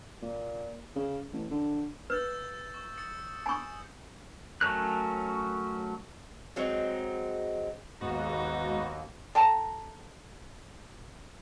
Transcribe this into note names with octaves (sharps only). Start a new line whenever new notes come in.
A#2
C#3
A1
D3
B4 E6 G6 A6
C#6
D#6 A6 C#7
G#5 C#6 D#6 G6
F#3 A3 C#4 A#4 F#6
F#3 G#3 C4 D#4
D#2 G#2 B3 D#4 F#4
A4 G5 A5 A#5